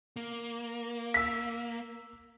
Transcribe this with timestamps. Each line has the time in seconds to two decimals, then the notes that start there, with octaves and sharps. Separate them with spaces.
0.16 A#3
1.14 E6 B6